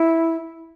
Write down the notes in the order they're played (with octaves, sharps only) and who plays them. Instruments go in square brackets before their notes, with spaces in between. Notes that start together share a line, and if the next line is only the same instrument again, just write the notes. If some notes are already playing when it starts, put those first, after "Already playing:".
Already playing: [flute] E4